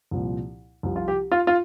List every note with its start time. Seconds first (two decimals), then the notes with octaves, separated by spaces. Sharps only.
0.11 C2 A#2 F3
0.83 C2 C3 F3
0.96 F4
1.08 G4
1.32 F4
1.47 F4